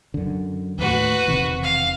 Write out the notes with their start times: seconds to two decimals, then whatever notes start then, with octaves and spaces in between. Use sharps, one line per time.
0.14 F#2 D3
0.78 D#2 A2 F#4 B4
1.28 E1 C3 D#3
1.63 F5